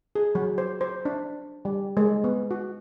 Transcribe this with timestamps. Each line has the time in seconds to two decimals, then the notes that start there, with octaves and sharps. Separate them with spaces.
0.15 G#4
0.35 F#3
0.58 C5
0.81 C5
1.05 D4
1.65 G3
1.97 G#3
2.24 B3
2.51 F#4